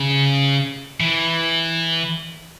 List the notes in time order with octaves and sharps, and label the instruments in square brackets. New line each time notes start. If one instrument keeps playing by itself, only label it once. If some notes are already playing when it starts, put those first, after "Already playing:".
Already playing: [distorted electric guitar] C#3
E3